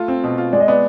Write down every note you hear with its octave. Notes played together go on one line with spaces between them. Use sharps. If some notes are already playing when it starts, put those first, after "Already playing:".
Already playing: A3 F4
C4
B2
F4
G#3 D5
D#5
B3 D5